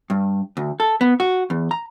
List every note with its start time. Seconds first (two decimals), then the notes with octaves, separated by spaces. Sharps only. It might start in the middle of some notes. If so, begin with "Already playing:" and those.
0.10 G2
0.57 D2
0.80 A4
1.01 B3
1.20 F#4
1.50 E2
1.71 A#5